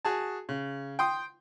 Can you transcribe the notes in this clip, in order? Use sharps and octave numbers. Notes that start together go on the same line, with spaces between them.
F#4 G#4 A5
C#3
G5 C6 D#6